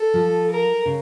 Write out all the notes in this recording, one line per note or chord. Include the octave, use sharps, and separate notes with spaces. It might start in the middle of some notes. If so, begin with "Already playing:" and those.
Already playing: A4
F3
A#4
C#3